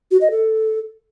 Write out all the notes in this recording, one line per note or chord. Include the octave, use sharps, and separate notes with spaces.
F#4
D#5
A4